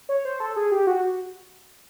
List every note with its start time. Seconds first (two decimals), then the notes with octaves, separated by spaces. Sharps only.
0.09 C#5
0.25 C5
0.40 A4
0.56 G#4
0.72 G4
0.87 F#4